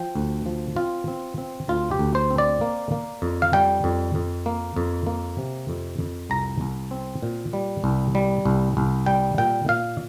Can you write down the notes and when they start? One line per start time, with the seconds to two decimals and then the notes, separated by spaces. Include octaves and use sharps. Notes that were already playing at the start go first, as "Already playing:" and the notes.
Already playing: F3 G5
0.15 D2
0.46 F3
0.76 C4 F4
1.08 C4
1.38 C4
1.68 D2 F4
1.91 G4
1.99 D2
2.15 C5
2.31 C4
2.38 D5
2.61 A#3
2.92 A#3
3.22 F2
3.42 F5
3.53 G3 G5
3.84 F2
4.15 F2
4.46 A#3
4.76 F2
5.07 A#3
5.38 C3
5.69 F2
5.99 F2
6.30 C2 A#5
6.61 C2
6.91 C4
7.23 A#2
7.53 G3
7.84 C2
8.15 G3
8.45 C2
8.77 C2
9.06 G3 G5
9.38 A#2 G5
9.68 A#2 F5